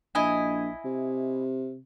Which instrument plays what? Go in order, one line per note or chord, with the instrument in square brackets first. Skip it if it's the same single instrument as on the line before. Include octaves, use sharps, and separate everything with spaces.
[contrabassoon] A#1 [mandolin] E4 D#5 G#5
[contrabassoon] C3